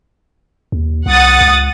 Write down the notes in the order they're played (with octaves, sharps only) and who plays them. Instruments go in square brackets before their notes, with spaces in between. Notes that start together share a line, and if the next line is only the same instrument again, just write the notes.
[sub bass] D#2
[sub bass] C2 [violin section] F#5 D#6 A6
[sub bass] C#2